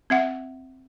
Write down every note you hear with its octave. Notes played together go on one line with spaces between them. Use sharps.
C4 E5 F#5